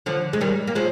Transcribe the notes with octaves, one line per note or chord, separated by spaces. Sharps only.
D3 F3
G#3
D#3 G3
A#3
F3 G#3